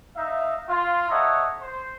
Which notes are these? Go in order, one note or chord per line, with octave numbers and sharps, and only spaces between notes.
D#4 E5 F5
F4
A4 C#5 D#5 E5 F#5 A#5
C5